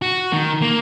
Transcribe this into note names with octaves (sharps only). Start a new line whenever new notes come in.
F#4
D#3
A#3